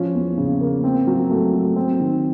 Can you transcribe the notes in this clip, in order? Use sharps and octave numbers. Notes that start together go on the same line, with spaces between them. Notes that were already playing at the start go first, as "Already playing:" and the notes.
Already playing: F3 C#4
E2
C#3
A#3
C4
F#3
A3
F#3
C4
D#3